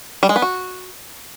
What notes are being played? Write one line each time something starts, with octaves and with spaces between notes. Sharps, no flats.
G3
G#3
B3
F#4